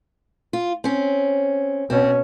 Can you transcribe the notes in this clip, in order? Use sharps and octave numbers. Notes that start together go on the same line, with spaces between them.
F4
C4 C#4
B2 C4 C#4